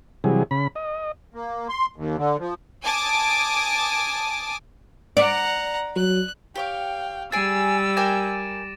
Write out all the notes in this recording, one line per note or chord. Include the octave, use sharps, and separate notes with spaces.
C3 E3 F#3 G3 G#4
C#3 B5
D#5
A#3
C6
D#2
D3
F3
G#5 A5 D6 D#6
D5 F#5 A#5
F#3 F#6
G4 C#5 F5 G5 D6
G3 G#4 G#5 E6 A6 D7 D#7
A#4 G5 G#5 D6 A#6 E7